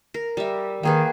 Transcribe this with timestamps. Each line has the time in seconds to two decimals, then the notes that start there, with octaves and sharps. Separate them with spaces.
0.14 A#4
0.37 G3 E5
0.83 D#3 A#3 G#4 B4